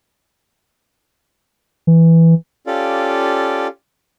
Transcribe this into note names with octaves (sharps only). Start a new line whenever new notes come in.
E3
C#4 F4 G4 A4 D5 F5